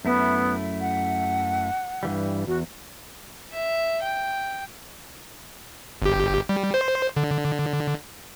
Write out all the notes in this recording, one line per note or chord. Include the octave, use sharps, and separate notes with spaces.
F#2 A3 B3 E4
F#5
G2 E3 G3
E2 F#4
E5
G5
G1 G4
G3
C5
D3